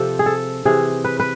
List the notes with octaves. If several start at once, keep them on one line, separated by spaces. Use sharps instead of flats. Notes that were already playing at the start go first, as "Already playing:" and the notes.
Already playing: C3 F3 A4
G#4
A4
C3 E3 G#4
B4
B4